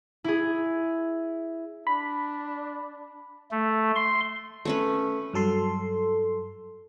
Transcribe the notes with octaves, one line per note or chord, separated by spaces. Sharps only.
E4 G#4
D4 B5
A3
C6
A3 C#4 B4
G2 F#3 A4 C6